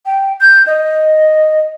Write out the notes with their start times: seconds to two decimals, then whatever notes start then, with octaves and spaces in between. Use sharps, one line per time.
0.06 G5
0.41 G6
0.67 D#5